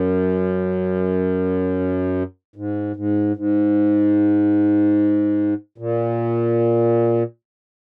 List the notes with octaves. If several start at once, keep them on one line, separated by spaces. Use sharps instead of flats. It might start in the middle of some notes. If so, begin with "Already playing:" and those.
Already playing: F#2
G#2
G#2
G#2
A#2